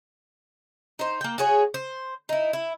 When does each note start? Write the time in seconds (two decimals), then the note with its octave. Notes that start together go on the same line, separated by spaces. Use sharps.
0.99 D#4 C5
1.21 A#3 G5
1.38 F#4 G#4 C#5
1.74 C5
2.29 D#4 E4
2.53 E4